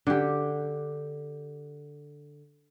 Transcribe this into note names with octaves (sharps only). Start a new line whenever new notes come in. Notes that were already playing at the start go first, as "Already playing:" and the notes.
D3 G4